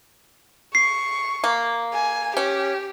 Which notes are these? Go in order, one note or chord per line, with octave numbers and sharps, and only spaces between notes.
C#6 C7
A#3
G#5
C#4 G4